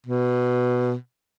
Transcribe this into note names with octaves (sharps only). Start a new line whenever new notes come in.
B2